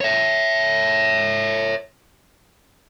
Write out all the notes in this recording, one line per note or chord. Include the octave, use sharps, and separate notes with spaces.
C#5 E5